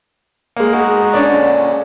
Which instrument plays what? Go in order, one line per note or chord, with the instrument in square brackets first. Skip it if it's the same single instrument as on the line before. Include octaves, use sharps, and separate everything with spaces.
[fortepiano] G#3 A#3
[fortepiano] G#3 [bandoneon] B3 D#4 F#4
[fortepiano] C#4 D4 D5
[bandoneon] A#2 D3 G#3